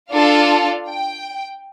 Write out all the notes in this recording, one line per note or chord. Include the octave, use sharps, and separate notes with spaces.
D4 F4 A4 F5
G5